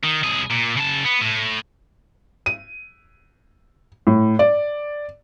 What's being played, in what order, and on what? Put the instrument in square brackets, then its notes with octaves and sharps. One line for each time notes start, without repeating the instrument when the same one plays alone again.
[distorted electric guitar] D#3
C2 G#4
A#2
C#3 A5
B3
A2
[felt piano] D#7
A2
D5